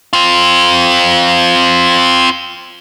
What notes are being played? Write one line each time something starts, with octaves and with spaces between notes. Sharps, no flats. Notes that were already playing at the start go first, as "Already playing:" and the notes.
C4 F4